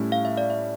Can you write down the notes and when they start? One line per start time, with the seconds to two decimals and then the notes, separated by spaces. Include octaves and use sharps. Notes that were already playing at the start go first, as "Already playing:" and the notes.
Already playing: A2 G3 C#4 E4
0.12 F5
0.25 E5
0.37 D5
0.50 E5